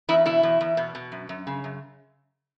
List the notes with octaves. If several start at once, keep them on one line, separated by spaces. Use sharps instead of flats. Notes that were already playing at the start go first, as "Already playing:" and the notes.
E2 E4
B2 E4
E2
E2
B2
B2
F#2
F#2
C#3
F#2